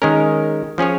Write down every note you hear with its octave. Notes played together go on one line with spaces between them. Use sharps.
D#3 G#3 C#4 A#4
F3 C#4 G#4 C#5